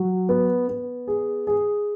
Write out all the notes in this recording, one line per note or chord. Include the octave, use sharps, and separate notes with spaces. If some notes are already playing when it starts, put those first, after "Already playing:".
Already playing: F#3
B3
B3
G#4
G#4